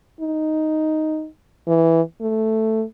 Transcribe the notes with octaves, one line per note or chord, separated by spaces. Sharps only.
D#4
E3
A3